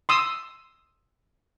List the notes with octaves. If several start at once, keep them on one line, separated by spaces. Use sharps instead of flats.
C6 D#6 E6